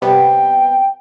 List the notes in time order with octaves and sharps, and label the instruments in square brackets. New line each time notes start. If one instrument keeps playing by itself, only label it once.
[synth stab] C3 G3 B3 [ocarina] G5